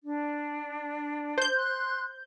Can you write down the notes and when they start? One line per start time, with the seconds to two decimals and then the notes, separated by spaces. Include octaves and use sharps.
0.04 D4
1.38 C5 G6
1.55 C6 F#6